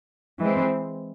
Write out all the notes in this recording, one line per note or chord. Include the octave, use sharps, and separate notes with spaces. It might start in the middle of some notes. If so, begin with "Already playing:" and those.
E3 G#3 C4